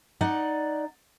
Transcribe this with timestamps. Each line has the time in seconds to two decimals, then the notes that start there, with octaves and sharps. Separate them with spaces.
0.21 D#4 D5 F#5